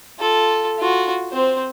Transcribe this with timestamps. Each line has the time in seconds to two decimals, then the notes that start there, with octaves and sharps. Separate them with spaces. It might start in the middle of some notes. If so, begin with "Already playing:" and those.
0.19 F4 A4
0.78 F4 F#4
1.31 C4 C5